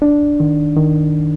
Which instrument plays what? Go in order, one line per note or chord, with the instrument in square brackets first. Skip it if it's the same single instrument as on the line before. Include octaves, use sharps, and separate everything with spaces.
[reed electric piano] D4
D#3
D#3